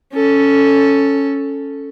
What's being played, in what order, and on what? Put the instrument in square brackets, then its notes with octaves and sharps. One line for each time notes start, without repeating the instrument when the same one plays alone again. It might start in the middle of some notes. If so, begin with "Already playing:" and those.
[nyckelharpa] C#4 A4